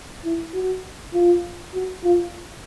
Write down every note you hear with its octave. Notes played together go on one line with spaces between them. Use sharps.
E4
F#4
F4
F#4
F4